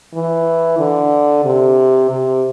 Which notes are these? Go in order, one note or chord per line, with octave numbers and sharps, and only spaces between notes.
E3
D3
C3
C3